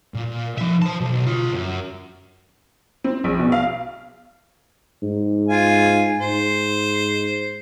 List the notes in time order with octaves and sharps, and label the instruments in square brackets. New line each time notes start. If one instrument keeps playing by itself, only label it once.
[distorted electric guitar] A#2
F3 E5
C5 A5
B1
F4 C#5
F#2
[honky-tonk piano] C4
A#1
B2
F5
[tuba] G#2
[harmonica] F4 G#5
[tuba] G#2 [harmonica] C5